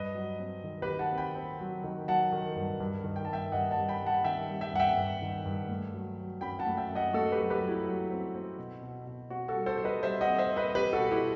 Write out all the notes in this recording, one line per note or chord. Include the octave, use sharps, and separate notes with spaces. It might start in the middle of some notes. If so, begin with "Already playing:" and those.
Already playing: G2 B4 D#5
F#3
C4
D#3
G4 B4
D#3
F#5 A5
C4
G5 B5
C4
F#3
D#3
F#3 F#5 A5
D#3
G2
G2
D#3
G5
A5
G2 E5 G5
G2 D#5 F#5
F#5 A5
G3
G5 B5
G3
F#5 A5
D#3 E5 G5
G3
E5 G5
G2 F#5
E5 G5
G2
D#3
G2
A3
F#3
F#3
F#2 G5 B5
F#5 A5
A3
E5 G5
F#2
D#5 F#5
A3 F#4 A4
G4 B4
F#3
G4 B4
F#3
E4
F#3
C4
C4
B2
B2
B2
C4 F#4
F#4 A4
G3
A4 C5
G3 C5
B4 D#5
G3 C5 E5
D#5 F#5
C4
C5 E5
C4
B4 D#5
C4 G4 B4
F#4 A4
B2
E4 G4